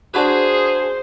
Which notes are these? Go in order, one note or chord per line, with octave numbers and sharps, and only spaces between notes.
D4 F#4 G#4 B4 C5